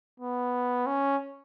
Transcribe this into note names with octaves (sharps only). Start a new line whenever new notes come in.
B3
C#4